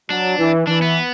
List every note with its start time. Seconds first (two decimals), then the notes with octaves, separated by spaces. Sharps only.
0.10 F#3 D4
0.39 E3
0.67 E3 D4
0.82 B3